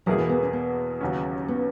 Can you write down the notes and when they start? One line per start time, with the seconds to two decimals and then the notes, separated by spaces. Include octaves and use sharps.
0.06 E2 B2 F#3 A#3 E4 G#4
0.18 E3
0.29 B3
0.42 C#4
0.53 B3
1.01 D#2 C#3 F#3 C#4
1.48 B3